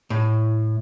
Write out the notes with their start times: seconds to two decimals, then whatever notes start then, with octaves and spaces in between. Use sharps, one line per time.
0.10 A2